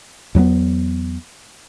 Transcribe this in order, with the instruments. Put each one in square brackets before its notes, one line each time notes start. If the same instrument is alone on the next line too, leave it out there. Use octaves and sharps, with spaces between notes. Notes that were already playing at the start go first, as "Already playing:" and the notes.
[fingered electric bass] E2 F#3 A#3 B3